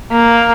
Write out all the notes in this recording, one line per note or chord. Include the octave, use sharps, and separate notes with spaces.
A#3